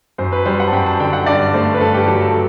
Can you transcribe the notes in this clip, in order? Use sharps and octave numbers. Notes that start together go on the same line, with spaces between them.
F#2 C5
B4
G3 C5
F#5
A5
F#2 G5
A5
D3 G5
F#5
G2 D5
A3 C5
B4
G2 A4
G4
F#3 A4
A4